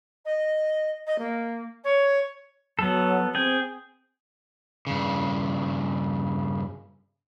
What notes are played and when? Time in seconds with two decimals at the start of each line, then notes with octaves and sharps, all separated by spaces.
0.25 D#5
1.06 D#5
1.18 A#3
1.84 C#5
2.79 F#3 B3 A4
3.35 C4 G#4 G5
4.87 G2 C#3